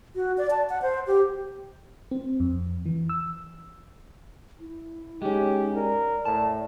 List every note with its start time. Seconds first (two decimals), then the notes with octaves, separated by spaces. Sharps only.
0.16 F#4
0.38 D5
0.51 A5
0.70 F#5
0.82 C5
1.07 G4
2.11 C4
2.40 F2
2.86 E3
3.09 E6
4.60 E4
5.22 G#3 C#4 D#4 G4
5.76 A#4 D5
6.25 A2 A5